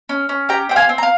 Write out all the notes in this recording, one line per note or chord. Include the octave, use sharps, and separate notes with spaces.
C#4
C#4
G4 G5 A#5
C4 G5
F5 G#5
C4
A#5
F5